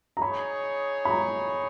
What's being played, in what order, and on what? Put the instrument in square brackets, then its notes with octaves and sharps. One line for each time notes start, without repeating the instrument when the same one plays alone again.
[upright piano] A#5
[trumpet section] D#4 G#4 C#5 [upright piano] B5
[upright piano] B5
A#5